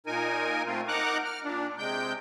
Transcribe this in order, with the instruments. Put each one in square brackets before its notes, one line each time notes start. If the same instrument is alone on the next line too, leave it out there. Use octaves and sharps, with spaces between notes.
[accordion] A#2 D#4 A#4 G#5
A3 C4 F4
D#4 A#4 F#5 A#5 D6 F#6
F6
A#2 D4
C3 G#3 G5 G6